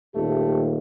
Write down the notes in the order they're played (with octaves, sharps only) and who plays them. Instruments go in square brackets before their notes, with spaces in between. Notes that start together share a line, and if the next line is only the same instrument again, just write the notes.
[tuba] D#1 [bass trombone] A3 [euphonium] G4